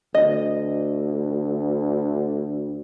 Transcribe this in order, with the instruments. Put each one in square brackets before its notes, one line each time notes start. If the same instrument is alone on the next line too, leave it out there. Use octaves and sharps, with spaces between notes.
[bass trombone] D2 [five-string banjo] D#5